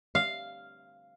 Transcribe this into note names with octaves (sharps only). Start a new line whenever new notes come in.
F5